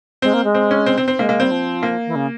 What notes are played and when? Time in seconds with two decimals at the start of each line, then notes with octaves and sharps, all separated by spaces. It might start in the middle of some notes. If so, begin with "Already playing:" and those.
0.22 G#3 C4
0.33 A#3
0.44 G#3
0.55 C4
0.71 C#4
0.86 C4
0.98 C4
1.08 C4
1.18 G#3 A#3
1.29 A#3
1.40 G3 C4
1.51 F3
1.83 A#3
2.07 E3
2.15 C#3